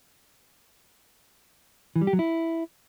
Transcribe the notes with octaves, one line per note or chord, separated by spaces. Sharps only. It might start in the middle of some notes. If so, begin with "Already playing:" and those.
E3
G3
G4
F#3
E4